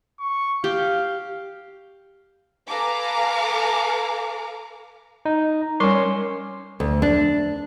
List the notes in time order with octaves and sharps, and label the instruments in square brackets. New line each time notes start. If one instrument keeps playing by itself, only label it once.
[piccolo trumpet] C#6
[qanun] G4 [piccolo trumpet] F5
[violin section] A4 B4 F5 G#5 A#5 D6
[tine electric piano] D#4
[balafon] G3 A#4 C#6 [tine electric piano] C#4 C6
[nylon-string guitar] D2
D4